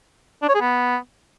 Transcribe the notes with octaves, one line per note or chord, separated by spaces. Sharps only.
D4
C#5
G#4
B3